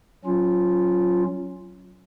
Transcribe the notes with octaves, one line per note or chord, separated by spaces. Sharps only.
F#3 C#4 F4